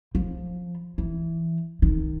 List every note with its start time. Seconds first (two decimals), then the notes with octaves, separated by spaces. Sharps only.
0.15 F3
0.98 E3
1.82 D#3